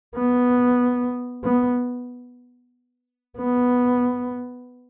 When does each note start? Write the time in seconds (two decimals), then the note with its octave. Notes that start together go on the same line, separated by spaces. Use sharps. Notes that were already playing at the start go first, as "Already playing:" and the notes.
0.16 B3
1.44 B3
3.38 B3